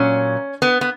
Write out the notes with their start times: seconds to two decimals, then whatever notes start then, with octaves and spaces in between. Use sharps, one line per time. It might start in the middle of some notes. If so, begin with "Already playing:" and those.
Already playing: A#2 F#3 C#4
0.62 B3
0.81 B3